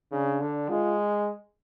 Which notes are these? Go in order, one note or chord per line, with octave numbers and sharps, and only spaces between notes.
C#3 D4
D3
G#3 F4